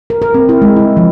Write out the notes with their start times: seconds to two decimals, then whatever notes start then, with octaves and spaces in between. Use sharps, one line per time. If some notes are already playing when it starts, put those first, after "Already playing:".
0.10 A#4
0.22 A#4
0.34 C4
0.49 E4
0.62 G#3
0.76 E4
0.97 F3